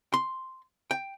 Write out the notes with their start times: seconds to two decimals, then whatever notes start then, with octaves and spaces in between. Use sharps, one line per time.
0.14 C6
0.91 G5